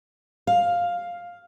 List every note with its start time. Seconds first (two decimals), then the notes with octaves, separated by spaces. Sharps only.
0.47 F5